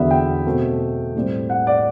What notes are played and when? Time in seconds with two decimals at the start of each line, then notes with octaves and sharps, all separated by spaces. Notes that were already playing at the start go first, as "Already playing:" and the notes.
Already playing: E2 D3 F#3 B3 E5
0.11 G5
0.46 B2 A3 C4
1.15 A2 G3 C4
1.50 F#5
1.67 D5